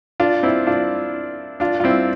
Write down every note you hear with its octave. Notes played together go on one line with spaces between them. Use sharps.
D4 F4
C4 E4
D4 F4
D4 F4
F4
C4 E4